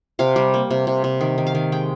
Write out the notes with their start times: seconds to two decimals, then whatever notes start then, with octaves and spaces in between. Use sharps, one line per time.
0.19 C3 F5
0.36 G3
0.54 A#3
0.71 C3
0.87 C3
1.04 C3
1.21 D#3
1.38 D#3
1.47 F5
1.55 D#3
1.72 G#3 G5